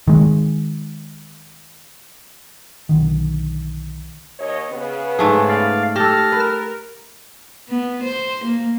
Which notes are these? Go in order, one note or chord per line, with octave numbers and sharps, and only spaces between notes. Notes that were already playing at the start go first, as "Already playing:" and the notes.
D#3 G#3
B1 D3 D#3
D#2 C#5 D#5
C#3 B3
G#2 A3 G#4
D5 F5
G4 A4 A5 F6 A#6
A#4 B4
B3
C5
A#3